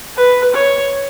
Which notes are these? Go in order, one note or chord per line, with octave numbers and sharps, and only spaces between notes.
B4
C#5